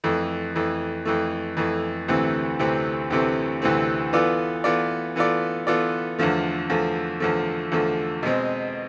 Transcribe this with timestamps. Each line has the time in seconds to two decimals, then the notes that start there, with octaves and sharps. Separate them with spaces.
0.04 F2 E3 A3
0.55 F2 E3 A3
1.05 F2 E3 A3
1.57 F2 E3 A3
2.08 D2 C3 E3 A3 C4
2.59 D2 C3 E3 A3 C4
3.10 D2 C3 E3 A3 C4
3.62 D2 C3 E3 A3 C4
4.13 E3 B3 F4 A4 D5
4.64 E3 B3 F4 A4 D5
5.16 E3 B3 F4 A4 D5
5.67 E3 B3 F4 A4 D5
6.19 E2 D3 F3 A3
6.70 E2 D3 F3 A3
7.20 E2 D3 F3 A3
7.72 E2 D3 F3 A3
8.23 B2 G#3 C4